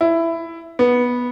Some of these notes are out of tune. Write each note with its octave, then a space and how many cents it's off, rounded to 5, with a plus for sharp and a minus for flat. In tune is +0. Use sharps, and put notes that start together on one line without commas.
E4 +10
B3 -10